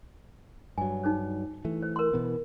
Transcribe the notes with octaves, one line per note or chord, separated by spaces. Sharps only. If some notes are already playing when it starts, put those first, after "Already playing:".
G2 F#3 G#5
D#4 G#4 C5
E3 A3
C5
A#4 C6
B2 E3 B3